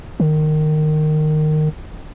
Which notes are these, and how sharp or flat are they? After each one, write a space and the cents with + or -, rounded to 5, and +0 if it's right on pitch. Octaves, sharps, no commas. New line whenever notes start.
D#3 -20